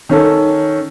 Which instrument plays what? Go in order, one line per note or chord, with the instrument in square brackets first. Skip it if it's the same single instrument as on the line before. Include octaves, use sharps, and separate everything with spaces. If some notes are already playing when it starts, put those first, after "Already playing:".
[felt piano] D#3 C#4 A4